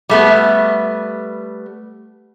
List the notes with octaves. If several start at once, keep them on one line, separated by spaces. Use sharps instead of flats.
G3 A3 B3